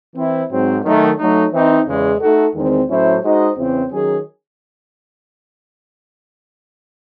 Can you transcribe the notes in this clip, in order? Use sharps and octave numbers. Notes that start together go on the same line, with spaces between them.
E3 C4 E4
G#2 F#3 C4
D#3 F#3 A3
F#3 A3 D#4
E3 C4 D#4
E2 C#3 G#3
A3 D#4 F#4 A4
E2 D#3 G#3 C4
A2 F#3 C#4 E4 C5
G#3 D#4 F#4 C5 D#5
E2 C#3 E3 C4
D#3 F#3 C#4 G#4